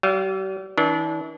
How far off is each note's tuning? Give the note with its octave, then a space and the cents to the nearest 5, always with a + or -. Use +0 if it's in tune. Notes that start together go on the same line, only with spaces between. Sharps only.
G3 -45 F5 +0
E3 -40 D4 -25